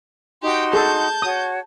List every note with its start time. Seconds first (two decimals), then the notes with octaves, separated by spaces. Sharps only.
0.42 D#4 F#4 G4 G5 C6
0.73 G#4 A4 A5 G6
1.22 F#4 C#5 D#6